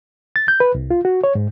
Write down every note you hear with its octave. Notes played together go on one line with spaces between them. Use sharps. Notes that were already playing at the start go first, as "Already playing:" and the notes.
A6
G6
B4
C2
F4
F#4
C#5
G#2